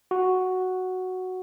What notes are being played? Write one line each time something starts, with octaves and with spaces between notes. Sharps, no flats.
F#4